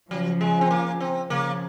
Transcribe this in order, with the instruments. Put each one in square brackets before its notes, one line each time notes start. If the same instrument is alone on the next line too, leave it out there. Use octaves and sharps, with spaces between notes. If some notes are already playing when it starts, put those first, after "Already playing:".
[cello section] C#3 F3 [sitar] F#3
[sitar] G#3
C4
A#3
C4
[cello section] C#3 F3 [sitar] A#3